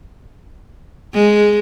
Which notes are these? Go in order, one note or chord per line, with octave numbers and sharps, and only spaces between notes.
G#3